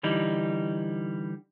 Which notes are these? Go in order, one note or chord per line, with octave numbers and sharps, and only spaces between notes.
D3 E3 G3 D#4